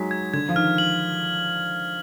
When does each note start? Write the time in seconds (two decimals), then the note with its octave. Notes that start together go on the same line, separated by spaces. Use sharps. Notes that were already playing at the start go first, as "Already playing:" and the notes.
Already playing: F#3 G#3 D#4 B6
0.11 G#6
0.33 D3 G#6
0.49 F3
0.56 D#3 F6
0.78 F#7